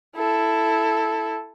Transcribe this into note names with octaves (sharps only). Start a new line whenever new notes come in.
E4 A4